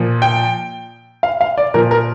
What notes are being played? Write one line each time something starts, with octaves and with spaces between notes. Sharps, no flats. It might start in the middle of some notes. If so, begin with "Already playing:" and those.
Already playing: A#2 F3
G5
F5
F5
D5
A#2 F3 A#4
A#4